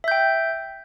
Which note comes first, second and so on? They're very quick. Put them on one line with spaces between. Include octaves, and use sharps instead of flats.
E5 G6 G5